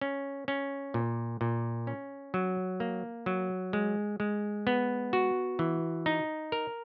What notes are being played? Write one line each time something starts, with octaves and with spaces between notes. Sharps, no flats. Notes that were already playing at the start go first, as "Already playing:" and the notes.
C#4
C#4
A#2
A#2
C#4
F#3
A#3
F#3
G#3
G#3
B3
F#4
E3
D#4
A#4